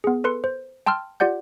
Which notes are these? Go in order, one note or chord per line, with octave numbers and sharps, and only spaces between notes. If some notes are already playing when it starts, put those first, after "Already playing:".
B3 G#4
A4 B4 C6 C#7
C5
G5 A5 C6 E6 F6
F4 G4 D5 F#5 G6